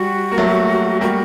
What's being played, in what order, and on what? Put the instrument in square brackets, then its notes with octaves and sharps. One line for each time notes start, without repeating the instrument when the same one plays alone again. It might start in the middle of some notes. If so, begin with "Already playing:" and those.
Already playing: [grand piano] G3 [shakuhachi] F#4
[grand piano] A#3
F#3 A3
[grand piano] G3 A#3 [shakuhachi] F#4